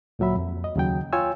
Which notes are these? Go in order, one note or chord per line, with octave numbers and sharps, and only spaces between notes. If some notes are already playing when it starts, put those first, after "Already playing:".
D2 A#2 F#3 E5 B5
F2
D#5
D#2 C#3 F#3 G5
F4 C#5 G5 G#5 E6